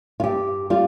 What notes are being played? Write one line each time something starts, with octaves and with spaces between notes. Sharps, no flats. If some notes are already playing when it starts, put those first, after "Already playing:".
F4
G2 G4
G3 F4